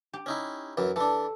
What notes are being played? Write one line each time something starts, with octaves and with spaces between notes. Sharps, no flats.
G4
C#4 D#4 E4
F#2 E3
E3 D4 A4